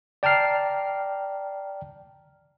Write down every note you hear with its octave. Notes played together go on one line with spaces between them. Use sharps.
D5 G5 A5 A#5 F6 C7